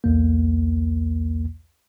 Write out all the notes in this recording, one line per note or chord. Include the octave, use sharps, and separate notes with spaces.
B1 E2 A#3